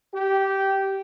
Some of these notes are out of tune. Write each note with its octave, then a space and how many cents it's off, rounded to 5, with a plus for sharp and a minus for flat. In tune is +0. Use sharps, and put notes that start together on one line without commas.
G4 -15